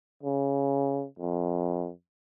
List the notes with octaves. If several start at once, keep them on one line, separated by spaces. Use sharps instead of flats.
C#3
F2